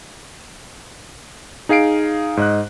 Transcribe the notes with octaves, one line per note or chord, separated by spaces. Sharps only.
D#4 G#4 F5 C7 D7
G#2 D#5 F#6